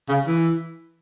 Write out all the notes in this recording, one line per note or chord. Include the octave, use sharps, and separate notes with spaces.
C#3
E3